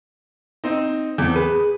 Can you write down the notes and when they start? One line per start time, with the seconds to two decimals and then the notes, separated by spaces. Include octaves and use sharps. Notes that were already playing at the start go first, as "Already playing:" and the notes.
0.64 C4 D#4
1.18 E2 C4
1.36 G#4 B4